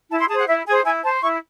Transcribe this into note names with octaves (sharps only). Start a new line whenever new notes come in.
E4 A5
C6
G#4 C5 A5
F#5
E4 E5
G#4 C5 G#5
E4 G#5
C5 A5
E4 C#6